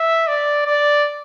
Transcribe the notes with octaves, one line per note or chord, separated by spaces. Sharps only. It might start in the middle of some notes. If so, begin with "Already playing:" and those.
Already playing: E5
D5
D5